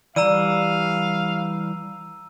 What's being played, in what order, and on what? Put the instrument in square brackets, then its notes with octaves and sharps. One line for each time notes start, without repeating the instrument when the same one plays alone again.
[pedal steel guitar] E3 G3 [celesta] D5 [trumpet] F5 [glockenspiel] A#5 E6 D#7